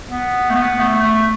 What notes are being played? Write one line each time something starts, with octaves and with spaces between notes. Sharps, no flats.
B3
A3
B3
A3
A3